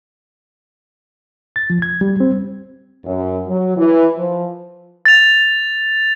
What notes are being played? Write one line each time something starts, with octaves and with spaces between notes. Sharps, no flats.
A6
F3
G#6
G3
C4
F#2
F#3
E3
F3
A6 F7